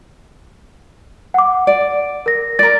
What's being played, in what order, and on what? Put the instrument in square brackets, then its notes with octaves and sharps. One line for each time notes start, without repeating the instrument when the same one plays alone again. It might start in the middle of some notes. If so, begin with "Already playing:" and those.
[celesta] F#5 D6
[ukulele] D5
[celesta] A#4 A#6
[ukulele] A#4 D5 [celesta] A6